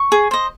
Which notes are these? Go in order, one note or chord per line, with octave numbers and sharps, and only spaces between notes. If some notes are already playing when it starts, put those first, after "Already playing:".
Already playing: C#6
G#4
C5 D#5